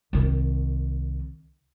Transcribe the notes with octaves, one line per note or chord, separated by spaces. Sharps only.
C2 D#3